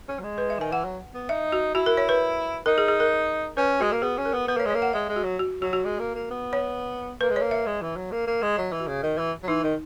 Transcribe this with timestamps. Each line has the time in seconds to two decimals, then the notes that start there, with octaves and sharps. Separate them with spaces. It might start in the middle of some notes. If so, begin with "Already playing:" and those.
0.08 C#4
0.19 F#3
0.23 G#3
0.38 B4
0.50 E5
0.59 D#3 G#5
0.71 E3 F#5
0.84 F#3
1.14 B3
1.29 D#4 E5
1.52 F#4
1.75 E4 F#4
1.86 A#4
1.97 C#5
2.09 B4
2.66 D#4 A#4
2.78 G#4
2.88 G#4
3.00 A#4
3.57 C#4 B4
3.80 G#3 F#4
3.92 A#3
4.02 B3 G#4
4.17 C#4
4.25 A#4
4.33 B3
4.48 B3 B4
4.57 A#3 C#5
4.65 G#3
4.70 C#5
4.74 A#3
4.82 F#5
4.93 G#3 E5
5.09 G#3
5.16 F#4
5.23 F#3
5.39 F#4
5.62 F#3 F#4
5.73 F#4
5.84 G#3
5.99 A#3
6.15 A#3
6.30 B3
6.53 C#5
7.21 A#3 B4
7.30 G#3
7.36 A#3 C#5
7.51 E5
7.66 G#3
7.82 E3
7.96 F#3
8.12 A#3
8.27 A#3
8.42 G#3
8.57 F#3 D#5
8.72 E3
8.80 F#4
8.87 C#3
9.03 D#3
9.18 E3
9.43 F#3
9.48 E3 D#4
9.64 D#3